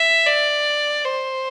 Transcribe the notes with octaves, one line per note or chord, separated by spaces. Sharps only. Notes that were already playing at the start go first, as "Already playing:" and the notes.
Already playing: E5
D5
C5